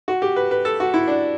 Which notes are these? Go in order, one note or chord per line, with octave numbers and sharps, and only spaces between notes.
F#4
G4
B4
B4
A4
F#4
E4
D4